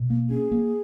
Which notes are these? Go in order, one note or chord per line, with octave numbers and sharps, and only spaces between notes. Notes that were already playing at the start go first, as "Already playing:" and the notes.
Already playing: B2
A#3
C#4 G#4
A#3